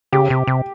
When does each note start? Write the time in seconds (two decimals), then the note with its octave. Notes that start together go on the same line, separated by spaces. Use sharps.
0.12 C#3 G4
0.30 C3
0.47 C3